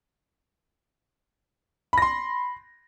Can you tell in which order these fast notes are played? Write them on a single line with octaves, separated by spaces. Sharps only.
B5 A#6 C6